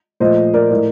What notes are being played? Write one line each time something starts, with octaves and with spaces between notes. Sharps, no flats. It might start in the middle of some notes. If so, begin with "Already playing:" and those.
A#2 F3 A3 C5 D#5
A#4 D5
A2 A3 A#4 D5